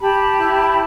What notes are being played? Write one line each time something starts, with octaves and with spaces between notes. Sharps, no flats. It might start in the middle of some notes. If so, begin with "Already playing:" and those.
G4 A5 B5
E4